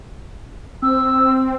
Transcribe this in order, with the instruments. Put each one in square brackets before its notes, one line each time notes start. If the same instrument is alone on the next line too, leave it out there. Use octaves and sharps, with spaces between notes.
[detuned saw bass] C4 [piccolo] E6